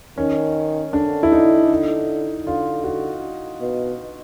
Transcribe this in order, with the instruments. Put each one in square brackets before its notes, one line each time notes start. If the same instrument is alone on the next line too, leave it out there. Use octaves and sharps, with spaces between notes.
[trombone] D#3 [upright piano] C#4
[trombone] D3 [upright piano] D4
[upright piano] E4
D#4
[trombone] D3
[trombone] D3 [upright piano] F4
[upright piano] F#4
[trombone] B2